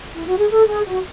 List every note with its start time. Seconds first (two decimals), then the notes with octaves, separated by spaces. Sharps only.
0.15 E4
0.27 F#4
0.38 G#4
0.51 A4
0.68 G#4
0.86 F#4